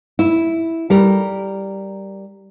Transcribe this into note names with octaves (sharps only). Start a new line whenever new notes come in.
E4
G3 A#4